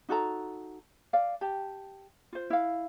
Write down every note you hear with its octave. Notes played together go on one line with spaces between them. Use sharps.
D#4 F#4 A4 A#5
D5 F5
G4 A5
F4 C5
E4 F5